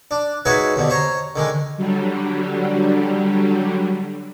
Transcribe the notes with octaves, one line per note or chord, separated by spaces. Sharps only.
D4
G#3 D#4 F#4 B4 C#5 E5
D#2 B2 D3
C5 C#5 A#5
D3 D#3 G#3
D3 F#3 G3